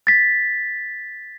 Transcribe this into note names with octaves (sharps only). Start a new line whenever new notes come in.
A6 B6